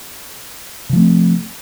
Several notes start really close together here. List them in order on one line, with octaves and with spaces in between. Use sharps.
C3 F3 A3 C4